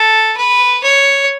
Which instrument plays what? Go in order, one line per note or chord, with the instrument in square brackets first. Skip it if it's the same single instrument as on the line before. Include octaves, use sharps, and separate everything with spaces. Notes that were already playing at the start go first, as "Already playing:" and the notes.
Already playing: [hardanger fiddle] A4
B4
C#5